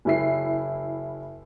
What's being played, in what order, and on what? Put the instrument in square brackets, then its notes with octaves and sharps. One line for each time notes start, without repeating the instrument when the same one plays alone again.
[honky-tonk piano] F#1 E4 C7